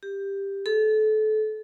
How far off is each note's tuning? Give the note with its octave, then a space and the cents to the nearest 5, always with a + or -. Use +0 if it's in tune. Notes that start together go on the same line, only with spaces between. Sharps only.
G4 +10
A4 -30